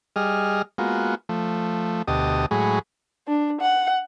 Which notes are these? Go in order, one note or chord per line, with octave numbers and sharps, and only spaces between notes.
G3 G#4 D#5 F6
G#3 A#3 B3 F4 F#4
F3 A3
D2 B2 G4 D#5 A5 D#6
A2 F#3 G#3 G#4 B5 C#6
D4
F#5